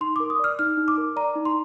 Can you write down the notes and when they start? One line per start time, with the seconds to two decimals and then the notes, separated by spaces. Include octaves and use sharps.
0.01 D#4 C6
0.16 A#4 D6
0.30 D#6
0.39 D5 F6
0.59 D#4 F6
0.77 D#4
0.88 D6
0.97 A#4
1.16 D5 A#5
1.36 D#4
1.45 C6